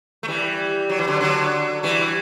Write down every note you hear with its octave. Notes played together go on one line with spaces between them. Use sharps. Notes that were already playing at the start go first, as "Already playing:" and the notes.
A3
E3 G3
F#3
E3
D3 F#3
D3 F#3
E3 G3